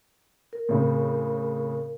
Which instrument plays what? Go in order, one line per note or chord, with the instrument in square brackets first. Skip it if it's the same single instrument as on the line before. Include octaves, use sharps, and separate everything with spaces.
[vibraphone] A#4
[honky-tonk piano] A2 C#3 C4